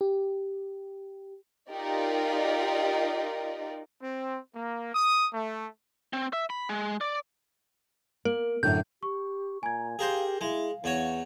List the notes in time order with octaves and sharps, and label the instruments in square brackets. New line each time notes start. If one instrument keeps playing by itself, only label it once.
[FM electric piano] G4
[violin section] D#4 F4 G4 A#4 D5 D#5
[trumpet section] C4
A#3
D#6
A3
[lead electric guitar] C4
E5
B5
G#3
D5
[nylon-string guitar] A#3 [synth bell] A#4
[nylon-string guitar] F#2 A2 D3 [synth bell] G6
[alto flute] G4 [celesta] C#6
[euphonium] A#2 [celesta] G#5 G#6 [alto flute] A#5
[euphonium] G4 [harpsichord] G#4 A#4 C5 [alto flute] F5
[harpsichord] G#3 [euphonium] E4 [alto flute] F5
[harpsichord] E2 F#4 C#5 [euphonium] E3